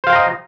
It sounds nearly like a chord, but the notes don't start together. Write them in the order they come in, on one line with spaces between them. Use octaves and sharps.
C5 F5 G5 A#5 D#5